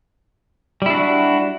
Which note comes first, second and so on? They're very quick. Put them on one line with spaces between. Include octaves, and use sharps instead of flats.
G3 E4 D4 F#4